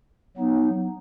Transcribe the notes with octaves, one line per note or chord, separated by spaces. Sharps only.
F#3 B3 D#4